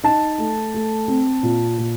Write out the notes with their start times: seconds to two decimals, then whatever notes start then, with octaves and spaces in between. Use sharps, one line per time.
0.04 D#4 A5
0.38 A3
0.74 A3
1.08 C4
1.43 A#2
1.78 A#2